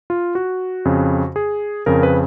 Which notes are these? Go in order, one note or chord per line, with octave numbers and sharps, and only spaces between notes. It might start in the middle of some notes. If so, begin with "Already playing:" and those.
F4
F#4
F2 C#3
G#4
F2 C#3 A#4
B4